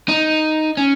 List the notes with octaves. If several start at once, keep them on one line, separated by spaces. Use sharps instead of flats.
D#4
C#4